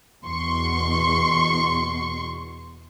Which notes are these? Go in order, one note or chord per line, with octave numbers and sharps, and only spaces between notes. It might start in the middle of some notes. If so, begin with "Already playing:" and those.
E2 B2 C6 C#6